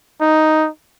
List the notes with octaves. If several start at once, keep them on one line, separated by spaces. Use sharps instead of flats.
D#4